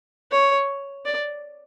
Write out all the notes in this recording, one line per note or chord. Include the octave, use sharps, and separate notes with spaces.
C#5
D5